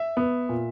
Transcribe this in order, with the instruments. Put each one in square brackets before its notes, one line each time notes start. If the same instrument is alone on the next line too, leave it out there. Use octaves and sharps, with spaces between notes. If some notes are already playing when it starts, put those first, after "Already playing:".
Already playing: [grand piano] E5
B3
A#2